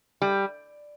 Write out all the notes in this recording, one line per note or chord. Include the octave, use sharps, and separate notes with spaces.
G3